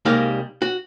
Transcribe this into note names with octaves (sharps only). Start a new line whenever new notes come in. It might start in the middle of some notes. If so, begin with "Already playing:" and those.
C2 G3 G#3 A#3 D#4 F5
F#4